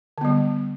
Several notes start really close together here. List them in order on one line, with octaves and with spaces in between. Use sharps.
D3 B3 G3